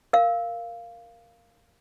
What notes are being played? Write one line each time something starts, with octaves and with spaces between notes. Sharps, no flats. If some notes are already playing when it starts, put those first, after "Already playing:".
A#4 F5